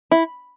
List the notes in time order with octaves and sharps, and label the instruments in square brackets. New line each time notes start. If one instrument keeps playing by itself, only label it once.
[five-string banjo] E4